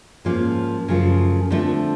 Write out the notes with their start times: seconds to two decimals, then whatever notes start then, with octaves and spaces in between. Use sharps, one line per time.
0.25 G#2 F3 A#3 C#4
0.88 F#2 C#3 F3 A3
1.51 D3 F3 A3 C4